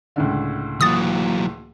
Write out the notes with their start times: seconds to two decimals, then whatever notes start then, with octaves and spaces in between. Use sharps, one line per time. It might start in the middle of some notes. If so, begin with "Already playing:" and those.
0.16 C#2 A2 D3
0.81 E3 F#3 A#3 D#6 A6